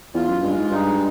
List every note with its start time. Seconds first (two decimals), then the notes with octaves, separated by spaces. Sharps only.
0.14 E2 F4
0.29 F#2
0.43 G2 G#3
0.57 G#2
0.71 G2 D#4